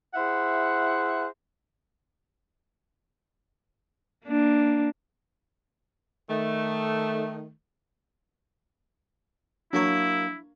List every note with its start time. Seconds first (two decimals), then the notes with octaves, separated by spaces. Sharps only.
0.14 E4 G#4 C5 E5 F#5
4.26 A#3 D4
6.30 D#3 A3
9.73 F#3 A#3 D4 E4 C#5